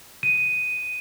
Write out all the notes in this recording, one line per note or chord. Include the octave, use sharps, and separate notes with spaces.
D#7